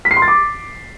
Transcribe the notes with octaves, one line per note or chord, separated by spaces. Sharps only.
B6
C7
C6
A6
D6